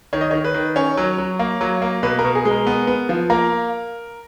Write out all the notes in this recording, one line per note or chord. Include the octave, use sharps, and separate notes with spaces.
D#3 C#5
D#5
D#3 C#5
B4
D#3
C#4 C#5
F#3
F#3
A#3
F#3
A#3
B2 B4
A#4
B2
G#4
G#3
A#4
B3
B3
F3
A#3 A#4